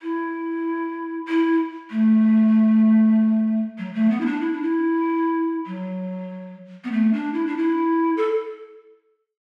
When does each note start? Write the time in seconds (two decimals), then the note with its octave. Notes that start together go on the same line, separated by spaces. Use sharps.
0.02 E4
1.28 E4
1.91 A3
3.78 F#3
3.94 A3
4.10 B3
4.21 E4
4.26 D4
4.41 E4
4.52 D4
4.63 E4
5.66 F#3
6.84 B3
6.92 A3
7.13 D4
7.34 E4
7.46 D4
7.57 E4
8.17 A4